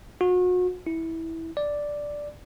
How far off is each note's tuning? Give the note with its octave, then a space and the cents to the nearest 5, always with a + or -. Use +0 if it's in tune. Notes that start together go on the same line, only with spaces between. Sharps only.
F#4 -35
E4 -15
D5 +0